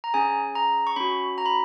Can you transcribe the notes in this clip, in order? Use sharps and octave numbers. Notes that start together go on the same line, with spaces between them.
A#5
C#4 G#4 G#5
A#5
C#6
C#4 F#4 B5
A#5
B5